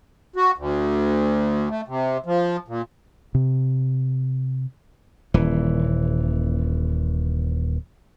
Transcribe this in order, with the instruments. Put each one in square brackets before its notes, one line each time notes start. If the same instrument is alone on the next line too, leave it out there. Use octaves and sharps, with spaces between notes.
[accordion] F#4
D2
A3
C3
F3
A#2
[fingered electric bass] C3
[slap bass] D#1 E3